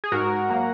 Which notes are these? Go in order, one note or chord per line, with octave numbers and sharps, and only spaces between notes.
G#4
G#2 F#4 A#4
F#3 A#3